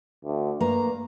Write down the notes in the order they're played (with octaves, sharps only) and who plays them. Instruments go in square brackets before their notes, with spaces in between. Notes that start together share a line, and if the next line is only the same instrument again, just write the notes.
[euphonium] D2
[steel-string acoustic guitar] G2 A#3 A#5 [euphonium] B4